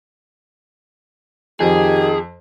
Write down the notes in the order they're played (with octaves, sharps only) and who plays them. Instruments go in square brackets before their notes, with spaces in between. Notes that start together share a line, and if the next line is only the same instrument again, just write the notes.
[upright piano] F2 [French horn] D#3 [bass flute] G4 [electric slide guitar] G#4